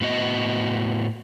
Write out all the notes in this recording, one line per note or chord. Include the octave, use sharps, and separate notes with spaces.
A2 B3 F#4 D#5